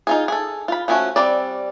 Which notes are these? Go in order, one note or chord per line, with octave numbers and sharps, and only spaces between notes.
D#4 F4 G#4
G#4 A4
F4 B5
F3 A3 C#4 F4 F#4
G3 C4 D5